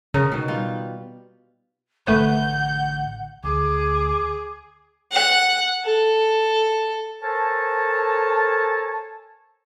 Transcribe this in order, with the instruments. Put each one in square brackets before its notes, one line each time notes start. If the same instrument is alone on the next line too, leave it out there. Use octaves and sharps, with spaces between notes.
[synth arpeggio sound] C#3 [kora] A#4
[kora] B2 D#3
G3 F4
[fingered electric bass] A1 D3 [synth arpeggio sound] A3 B4 [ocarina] F#5 [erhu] G6
[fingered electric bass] D2 [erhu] G#4 [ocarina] D6
[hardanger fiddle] F#5
A4
[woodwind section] A4 A#4 C5 C#5 G#5 A5